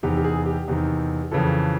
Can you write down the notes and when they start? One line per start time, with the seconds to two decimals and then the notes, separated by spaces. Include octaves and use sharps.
0.03 E2 C3 D#3 G4
0.17 G4
0.24 G#4
0.46 G4
0.68 E2 C3 D#3
1.31 F2 C#3 E3 A4